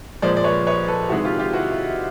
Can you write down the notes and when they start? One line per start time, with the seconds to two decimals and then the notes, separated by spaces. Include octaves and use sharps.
0.22 A#2 F3 G#3 C5 D5
0.37 D5
0.44 B4 C#5
0.66 B4 C#5
0.88 A4 B4
1.10 C3 D#3 G#3 E4 F#4
1.25 F4 G4
1.39 F4 G4
1.53 E4 F#4